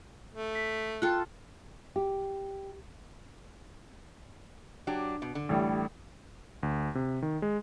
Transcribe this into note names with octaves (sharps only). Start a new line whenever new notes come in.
A3
B6
F4 A4 G5 F#6
G4
F#3 D4 G4
B2
D3
A1 A2 G3
D2
C3
D#3
G#3